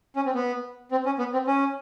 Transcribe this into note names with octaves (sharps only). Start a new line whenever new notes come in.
C#4
C4
B3
C4
C#4
B3
C4
C#4